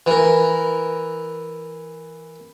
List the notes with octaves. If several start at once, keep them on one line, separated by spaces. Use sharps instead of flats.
E3 A#4